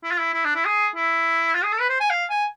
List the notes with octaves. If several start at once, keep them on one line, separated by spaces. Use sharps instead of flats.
E4
F4
E4
E4
D4
E4
G#4
E4
F4
G#4
A4
B4
C5
G#5
F5
G#5